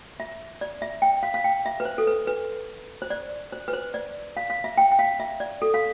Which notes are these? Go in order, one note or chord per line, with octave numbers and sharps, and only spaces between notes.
E5
D5
E5
G5
F5
F5
G5
E5
B4
C5
A4
B4
B4
C5
D5
C5
B4
C5
D5
F5
F5
E5
G5
G5
F5
E5
D5
A4
F5